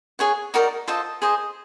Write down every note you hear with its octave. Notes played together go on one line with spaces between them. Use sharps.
G#4 C#5 F#5
D#4 F#4 A#4 D5
F4 A4 C5 D#5
G#4 C5 D#5